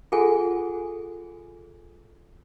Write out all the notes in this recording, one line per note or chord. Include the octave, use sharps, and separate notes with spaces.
F4 G#4 A4 F#5 G#5